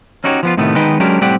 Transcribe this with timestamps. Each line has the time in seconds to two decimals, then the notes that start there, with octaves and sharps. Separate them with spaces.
0.24 C#4 D#4 F#4 G4 C5 C#5
0.43 F3 B3 F4
0.57 A2 C3 D#3 A3 B3
0.76 D#3 G#3 B3 D#4 B4 G5
1.00 F#3 G#3 C#4 D4 G4 A#4
1.21 A2 G3 C4 G4 D5 F#5